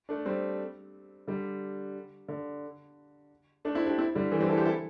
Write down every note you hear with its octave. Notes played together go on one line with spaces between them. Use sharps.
A3 D4
G3 C4
D3 G3
D3
A3 D4
C4 E4
D4 G4
C4 E4
D3 G3
E3 A3
G3 C4
E4 A4
G4 C5
E4 A4